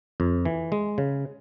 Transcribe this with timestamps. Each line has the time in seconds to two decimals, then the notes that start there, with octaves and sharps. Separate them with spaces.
0.20 F2
0.45 E3
0.72 G#3
0.98 C#3